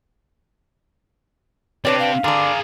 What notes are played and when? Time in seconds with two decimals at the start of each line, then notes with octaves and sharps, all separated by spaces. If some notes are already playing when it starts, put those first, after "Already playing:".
1.85 C4 D4 G4 B4 C#5 D5
1.99 F5
2.24 D3 D4 G#4 A#4